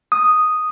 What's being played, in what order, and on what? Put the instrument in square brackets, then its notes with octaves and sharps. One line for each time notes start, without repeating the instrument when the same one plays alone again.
[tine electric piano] D#6